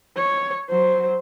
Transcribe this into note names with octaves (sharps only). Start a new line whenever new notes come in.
C#5
F#3 C5